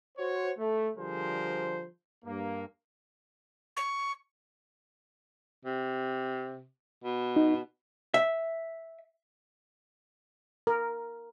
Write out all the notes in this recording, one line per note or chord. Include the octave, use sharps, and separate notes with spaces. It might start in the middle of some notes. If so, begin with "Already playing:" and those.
F#4 C5 C#5
A3
D3 F3 G3 G#4 A#4 C5
G2 A#3
C#6
C3
B2
D#4
E5
A#4